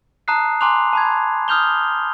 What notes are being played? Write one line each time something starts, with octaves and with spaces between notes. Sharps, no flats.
A5 A#5 D#6 F#6 C7
G#5 A#5 C6 D6 F#6 F7
A5 B5 G#6
D#6 F6 G6 F7 G7